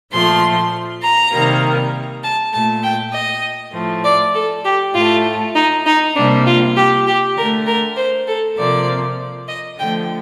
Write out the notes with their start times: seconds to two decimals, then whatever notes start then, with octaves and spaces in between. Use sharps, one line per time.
0.11 A#2 F3 A3 C6
1.01 A#5
1.32 C3 D#3 G3 A#3
2.23 A5
2.52 A#2 A3 A5
2.82 G5
3.12 D#5
3.73 A2 F3 A3
4.04 D5
4.34 A4
4.64 G4
4.94 A2 A3 F4
5.54 D#4
5.85 D#4
6.15 C3 G3 A#3 D4
6.45 F4
6.76 G4
7.06 G4
7.36 D3 A3 A#4
7.66 A#4
7.96 C5
8.27 A4
8.57 C3 F3 A#3 D5
9.47 D#5
9.77 D3 F3 A3 G5